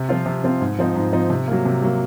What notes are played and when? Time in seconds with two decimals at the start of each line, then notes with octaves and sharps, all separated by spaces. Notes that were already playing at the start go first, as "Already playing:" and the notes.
Already playing: C3
0.09 F3 C4 F4
0.26 C3
0.44 F3 C4 F4
0.61 G#2
0.79 F3 C4 D#4
0.95 G#2
1.12 F3 C4 D#4
1.30 C3
1.48 F#3 A#3
1.65 C3
1.82 F#3 A#3